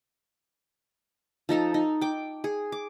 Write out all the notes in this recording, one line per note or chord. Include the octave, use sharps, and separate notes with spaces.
F3 D#4 A4 A#5
D#4
G5 D6
G#4
D6